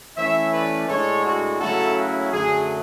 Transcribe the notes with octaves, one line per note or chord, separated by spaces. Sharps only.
E3 A3 C#4 C#5 E5
B4 D5
A2 G#3 D4 A4 C#5
F#4 A4
C#3 F#3 A3 C#4 E4 F#4 A4
F#4
F#2 D3 F#3 A3 G#4